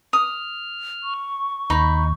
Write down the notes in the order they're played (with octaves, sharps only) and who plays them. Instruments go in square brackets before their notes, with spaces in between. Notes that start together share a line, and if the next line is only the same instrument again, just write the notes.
[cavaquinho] D#6 [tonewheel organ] F6
[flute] C#6
[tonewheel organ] D#2 [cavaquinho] D#4 B5